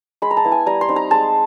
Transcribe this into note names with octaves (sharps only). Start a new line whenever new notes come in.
G#3 B5
A#5
A5
B3 E4
G#5
G3 A#5
C6
C4 D#4
A#5
G#3 A5